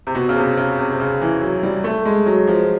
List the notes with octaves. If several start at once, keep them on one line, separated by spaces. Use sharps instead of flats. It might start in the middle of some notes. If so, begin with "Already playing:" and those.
C3
B2
C#3
C3
C#3
C3
C3
C#3
E3
F#3
G3
A3
G#3
F#3
F3